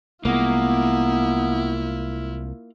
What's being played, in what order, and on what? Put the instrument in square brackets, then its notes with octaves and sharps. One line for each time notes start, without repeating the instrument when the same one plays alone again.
[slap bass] C2 G#3 [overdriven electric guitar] A#3 [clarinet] B3 [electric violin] E4 F4